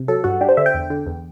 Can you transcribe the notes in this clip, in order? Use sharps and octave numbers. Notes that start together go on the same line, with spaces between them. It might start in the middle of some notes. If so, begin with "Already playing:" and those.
Already playing: C3
F#3 A4
G2 F#4
D4 G4
C5
D3 E5
G5
E2
D3
E2